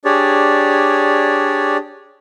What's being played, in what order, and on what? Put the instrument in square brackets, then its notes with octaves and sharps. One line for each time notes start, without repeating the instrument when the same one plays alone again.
[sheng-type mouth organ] D4 G4 G#4 C#5 D5